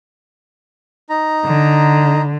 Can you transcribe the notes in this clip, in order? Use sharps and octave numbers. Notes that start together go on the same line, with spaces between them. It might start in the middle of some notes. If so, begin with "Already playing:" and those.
D#4 A#5
D3